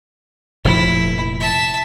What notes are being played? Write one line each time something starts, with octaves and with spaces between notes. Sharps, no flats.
F1 A#2 F3 E4
E5 A5